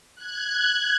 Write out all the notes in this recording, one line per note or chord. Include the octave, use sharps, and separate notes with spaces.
F#6 G#6